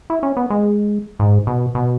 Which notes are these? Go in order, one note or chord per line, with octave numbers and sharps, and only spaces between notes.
E4
C#4
B3
G#3
G#2
B2
B2